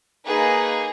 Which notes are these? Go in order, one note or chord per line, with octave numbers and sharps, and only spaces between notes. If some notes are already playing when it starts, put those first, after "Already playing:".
A#3 D#4 G#4 B4